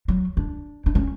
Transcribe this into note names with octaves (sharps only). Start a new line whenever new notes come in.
F#3
D4
D4
C#4